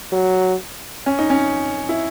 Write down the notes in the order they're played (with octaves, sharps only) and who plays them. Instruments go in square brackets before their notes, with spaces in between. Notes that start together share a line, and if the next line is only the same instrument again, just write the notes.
[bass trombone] F#3
[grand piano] C#4
D#4
C#4
E4